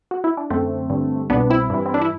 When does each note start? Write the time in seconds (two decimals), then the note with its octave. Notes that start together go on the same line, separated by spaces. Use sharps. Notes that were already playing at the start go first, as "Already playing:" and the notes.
0.11 F#4
0.24 E4
0.37 D4
0.50 F#2 D3 A3 C4
0.90 G2 D3
1.30 C2 B2 B3 D4
1.50 C4 E4
1.70 G2 E3
1.86 C4
1.94 D4
2.02 E4